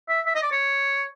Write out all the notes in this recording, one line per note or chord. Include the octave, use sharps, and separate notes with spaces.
E5
E5
D#5
D5
C#5